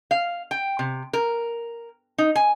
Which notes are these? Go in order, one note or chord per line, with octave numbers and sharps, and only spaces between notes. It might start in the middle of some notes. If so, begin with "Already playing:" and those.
F5
G5
C3
A#4
D#4
G#5